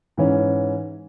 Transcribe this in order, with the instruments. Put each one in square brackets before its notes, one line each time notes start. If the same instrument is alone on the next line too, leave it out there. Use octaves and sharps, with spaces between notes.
[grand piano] G#2 E3 C#4